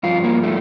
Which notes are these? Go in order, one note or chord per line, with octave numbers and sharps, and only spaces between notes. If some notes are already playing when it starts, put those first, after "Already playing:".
G2 F3 F4
A#3
A3